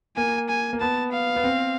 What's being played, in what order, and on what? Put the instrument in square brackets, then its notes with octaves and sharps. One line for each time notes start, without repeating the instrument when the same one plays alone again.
[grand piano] A#3 [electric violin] G#5
[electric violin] G#5
[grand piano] A#3
[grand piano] B3 [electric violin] A5
[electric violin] F5
[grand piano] B3
C4